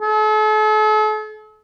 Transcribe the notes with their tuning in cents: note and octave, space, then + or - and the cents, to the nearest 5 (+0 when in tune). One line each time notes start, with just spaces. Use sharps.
A4 -40